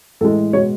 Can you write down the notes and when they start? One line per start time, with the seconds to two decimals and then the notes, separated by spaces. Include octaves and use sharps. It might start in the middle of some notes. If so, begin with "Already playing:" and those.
0.21 A2 E3 G#3 A4
0.53 B2 G#3 C#5